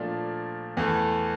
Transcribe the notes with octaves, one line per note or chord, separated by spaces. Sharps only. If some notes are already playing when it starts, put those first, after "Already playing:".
Already playing: A#2 F3 A3 D4
E2 E3 A3